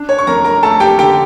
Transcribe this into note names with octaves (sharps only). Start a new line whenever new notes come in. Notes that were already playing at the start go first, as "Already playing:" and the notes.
Already playing: D4
C#5
C#6
F2 A#4 A#5
A#4 A#5
A3 A4 A5
G4 G5
D3 G4 G5